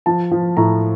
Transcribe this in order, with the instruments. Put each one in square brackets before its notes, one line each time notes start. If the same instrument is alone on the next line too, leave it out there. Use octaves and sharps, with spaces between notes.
[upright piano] F3 A5
F3
A2 A#5